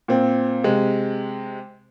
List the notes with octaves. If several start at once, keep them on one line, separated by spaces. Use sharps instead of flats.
A#2 C4
C3 G#3